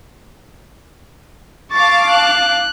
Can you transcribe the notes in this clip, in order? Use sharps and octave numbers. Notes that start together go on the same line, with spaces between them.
F5 A5 C#6 D6 A6
F#6